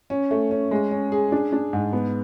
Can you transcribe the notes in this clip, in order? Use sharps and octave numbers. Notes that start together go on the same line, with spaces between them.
C#4
A3
C#4
G#3
C#4
G#4
D4
D4
G#2
B3